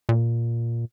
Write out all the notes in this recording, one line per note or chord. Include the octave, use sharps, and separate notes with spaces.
A#2